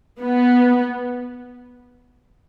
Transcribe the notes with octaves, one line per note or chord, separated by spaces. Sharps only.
B3